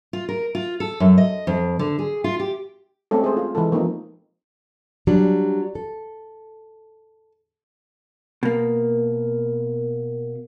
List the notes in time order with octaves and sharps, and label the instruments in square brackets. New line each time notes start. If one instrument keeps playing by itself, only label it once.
[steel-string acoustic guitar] F4
A#4
F4
A4
F#2
D#5
F2
D3
G#4
F4
G4
[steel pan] G#3 A3 C4 C#4 A4
G#4 C5
F4
E3 G#3 A4
F3 A#3 C4 D#4
[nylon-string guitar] F#3 G3 D4
A4
[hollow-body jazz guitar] B2 A#3